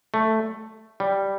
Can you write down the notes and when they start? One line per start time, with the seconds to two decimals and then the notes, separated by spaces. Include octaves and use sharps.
0.14 A3
1.00 G3